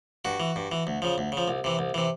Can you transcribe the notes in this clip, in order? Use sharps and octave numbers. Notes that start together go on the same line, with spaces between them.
G2 F#4
E3
G2
E3
D2
C#3 F3
D2
C#3
F3
C2
C3 E3
C2
C3 E3